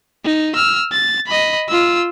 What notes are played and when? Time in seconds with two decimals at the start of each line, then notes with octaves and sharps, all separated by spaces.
0.25 D#4
0.55 E6 F6
0.92 A6
1.27 D#5 B5
1.69 F4 E6